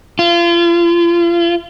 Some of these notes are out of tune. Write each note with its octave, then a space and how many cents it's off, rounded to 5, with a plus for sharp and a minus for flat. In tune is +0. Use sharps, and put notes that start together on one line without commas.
F4 -35